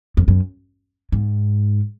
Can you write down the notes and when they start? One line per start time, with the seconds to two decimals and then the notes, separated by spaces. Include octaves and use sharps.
0.17 F2
0.28 F#2
1.12 G#2